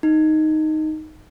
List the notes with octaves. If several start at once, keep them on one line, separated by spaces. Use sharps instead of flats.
D#4